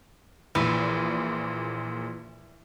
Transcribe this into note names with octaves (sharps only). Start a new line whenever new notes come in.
A#1 A#2 E3